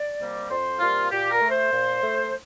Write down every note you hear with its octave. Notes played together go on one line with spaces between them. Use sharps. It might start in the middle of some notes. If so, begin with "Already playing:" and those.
Already playing: D5
C3 G3 A#3
F2 C5
C3 G3 A#3 F4
A#2 G4
A#4
A3
C5
A#2
A3